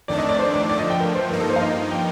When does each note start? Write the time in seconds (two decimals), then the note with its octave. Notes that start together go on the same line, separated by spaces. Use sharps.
0.08 F2 D#3 A3 D4 D5
0.18 D#5
0.29 D5
0.39 C5
0.54 D5
0.69 D3 F3 A3 D5
0.79 D#5
0.90 G5
1.00 A#4
1.15 C5
1.30 G2 F3 A#3 D#4 A#4
1.40 A4
1.50 C5
1.56 F5
1.61 D#5
1.91 G5